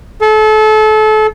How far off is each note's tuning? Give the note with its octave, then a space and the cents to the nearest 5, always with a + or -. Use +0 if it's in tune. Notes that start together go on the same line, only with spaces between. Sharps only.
A4 -30